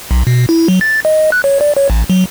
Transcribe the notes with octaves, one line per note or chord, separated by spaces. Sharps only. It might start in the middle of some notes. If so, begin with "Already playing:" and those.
B1
B2
E4
F#3
A6
D#5
F#6
C#5
D5
C#5
A1
F#3